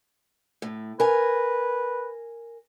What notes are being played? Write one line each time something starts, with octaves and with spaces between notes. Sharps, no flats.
A2
A#4 B4 G#5